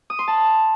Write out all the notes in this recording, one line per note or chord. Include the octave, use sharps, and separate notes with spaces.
D#6
C6
A5